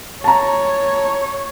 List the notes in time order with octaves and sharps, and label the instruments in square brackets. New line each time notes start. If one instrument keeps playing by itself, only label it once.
[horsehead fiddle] C#5 [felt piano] A5 A#5